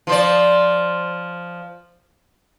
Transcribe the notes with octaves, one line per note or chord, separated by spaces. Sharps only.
F3 C5 D5